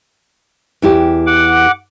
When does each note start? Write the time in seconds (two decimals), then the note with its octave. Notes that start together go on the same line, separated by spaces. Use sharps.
0.82 E2 E4 G4
1.27 F#5 D6